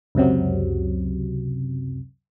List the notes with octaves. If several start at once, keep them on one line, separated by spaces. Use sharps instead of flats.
C#2 F#2 C3 F#3